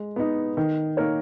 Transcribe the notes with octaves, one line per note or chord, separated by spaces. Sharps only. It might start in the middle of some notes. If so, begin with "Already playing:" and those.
Already playing: G#3
B3 D#4
D#3
A#3 D#4 A#4 C#5